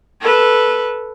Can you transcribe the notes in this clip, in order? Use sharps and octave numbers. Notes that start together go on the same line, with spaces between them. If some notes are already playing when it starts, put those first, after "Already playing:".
A4 B4